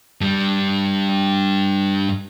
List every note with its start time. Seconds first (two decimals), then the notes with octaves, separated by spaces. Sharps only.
0.21 G2 G3